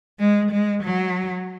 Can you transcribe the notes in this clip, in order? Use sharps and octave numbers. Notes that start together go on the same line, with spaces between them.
G#3
G#3
F#3